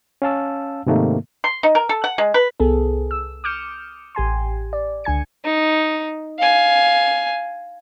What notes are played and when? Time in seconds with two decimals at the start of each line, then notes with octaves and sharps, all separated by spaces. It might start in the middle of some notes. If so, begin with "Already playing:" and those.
0.22 C#4 F5 A5 E6
0.86 G#2 C3 D#3 A3 A#3
1.44 C6
1.63 D#4
1.75 A#4
1.89 A4
2.04 F#5
2.18 G#3
2.34 B4
2.60 C2 B3 G#4 A4
3.11 E6
3.44 D6 D#6 F6 G6 C#7 E7
4.15 A1 G4 G#5 C6
4.73 D5
5.04 C#2 D3 G#5 G#6 C#7
5.45 D#4
6.39 F5 G#5